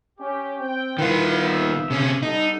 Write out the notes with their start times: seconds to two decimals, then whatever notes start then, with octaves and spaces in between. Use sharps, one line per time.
0.20 C#4 G4
0.60 C4 G5
0.99 D#3 E4 F4 B4
1.41 G1 B3 E5
1.90 C3 C#4
2.23 G3 B3 D#4 A4